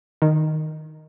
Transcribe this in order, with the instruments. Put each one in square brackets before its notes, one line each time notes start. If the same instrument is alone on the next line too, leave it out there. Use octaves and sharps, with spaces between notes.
[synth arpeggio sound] D#3